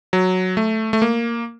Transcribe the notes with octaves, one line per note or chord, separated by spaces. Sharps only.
F#3
A3
A3
A#3